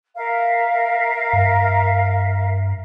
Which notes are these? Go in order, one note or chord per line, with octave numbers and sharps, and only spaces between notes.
A#4 E5 F5
G2